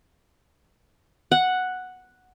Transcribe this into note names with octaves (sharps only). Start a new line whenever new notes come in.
F#5